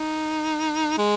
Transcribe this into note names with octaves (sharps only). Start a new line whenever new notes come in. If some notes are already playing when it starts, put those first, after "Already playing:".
Already playing: D#4
G#3